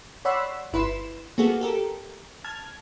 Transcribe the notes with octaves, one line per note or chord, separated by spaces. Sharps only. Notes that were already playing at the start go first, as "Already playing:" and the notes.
C#5 D5 F#5 B5 C6 E6
G1 E4 B4 C6 E7
A#3 B3 F#4 G#4 A4
G4 A4 A#4
A5 F6 G#6